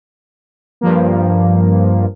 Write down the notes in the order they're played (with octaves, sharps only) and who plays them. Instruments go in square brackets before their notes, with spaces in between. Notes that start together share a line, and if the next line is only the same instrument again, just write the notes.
[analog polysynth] G2 F3 A#3